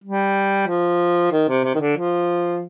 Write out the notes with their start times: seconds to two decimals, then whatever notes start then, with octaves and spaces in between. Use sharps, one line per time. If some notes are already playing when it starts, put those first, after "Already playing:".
0.04 G3
0.68 F3
1.32 D#3
1.48 C3
1.64 C3
1.75 D#3
1.80 D3
1.97 F3